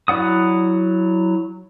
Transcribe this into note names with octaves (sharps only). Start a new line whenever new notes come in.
F#3 E4 D5 F#5 D#6